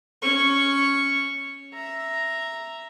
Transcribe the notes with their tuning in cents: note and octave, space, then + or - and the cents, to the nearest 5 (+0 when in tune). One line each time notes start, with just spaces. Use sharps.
C#4 +0 C#6 +0
E5 +0 A#5 +0